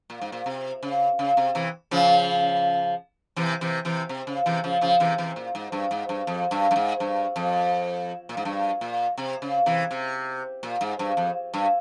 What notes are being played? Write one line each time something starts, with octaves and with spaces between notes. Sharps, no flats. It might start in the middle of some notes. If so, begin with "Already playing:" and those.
A#2
G#2
A#2
C3
C#3
C#3
C3
C3 E3
C#3 F3
C3 E3
C3 E3
C3 E3
C3
C#3
C3 E3
C#3 F3
C#3 F3
C3 E3
C3 E3
A#2
G#2
G2
G#2
G2
F2
G2
G2
G#2
G2
F2
A#2
G#2
G2
A#2
C3
C#3
C3 E3
C3
A#2
G#2
G2
F2
G2